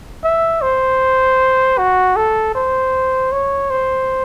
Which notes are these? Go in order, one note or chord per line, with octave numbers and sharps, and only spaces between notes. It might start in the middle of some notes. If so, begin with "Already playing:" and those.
E5
C5
F#4
A4
C5
C#5
C5